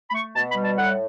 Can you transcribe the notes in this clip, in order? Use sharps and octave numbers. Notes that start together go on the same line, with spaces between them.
B5
A3 C#6
B2 A5
B5
G3
A5
A2 F#5